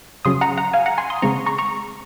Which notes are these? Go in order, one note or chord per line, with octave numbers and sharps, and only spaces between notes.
C#3 F#3 C#4 C6 D#6
F#5 A#5
F#5 A#5
F5 G#5
F#5 A#5
G#5 C6
C6 D#6
C#3 G#3 C4 A#5 C#6
A#5 C#6
A#5 C#6